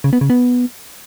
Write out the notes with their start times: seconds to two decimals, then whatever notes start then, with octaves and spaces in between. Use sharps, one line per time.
0.04 C#3
0.13 B3
0.21 C#3
0.30 B3